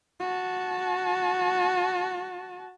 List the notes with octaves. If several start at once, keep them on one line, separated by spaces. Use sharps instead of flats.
F#4 A5